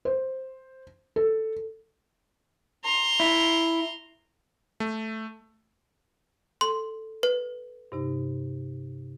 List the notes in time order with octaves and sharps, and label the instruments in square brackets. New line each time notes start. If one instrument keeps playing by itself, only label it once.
[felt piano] C5
A4
[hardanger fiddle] A#5 C6
[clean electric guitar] E4
[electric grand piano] A3
[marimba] A4 [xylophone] C6
[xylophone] B4
[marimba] G2 C3 D#4